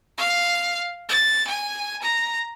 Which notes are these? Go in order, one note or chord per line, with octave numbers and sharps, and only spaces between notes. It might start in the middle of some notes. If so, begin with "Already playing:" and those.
F5
A6
G#5
A#5